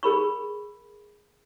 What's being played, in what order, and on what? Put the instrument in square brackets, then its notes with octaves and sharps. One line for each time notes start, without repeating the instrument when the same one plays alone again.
[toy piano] G#4 A#4 B5 C#6